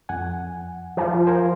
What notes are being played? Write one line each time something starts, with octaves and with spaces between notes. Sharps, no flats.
F2 F#5 G#5
F3
A#4 C5 G#5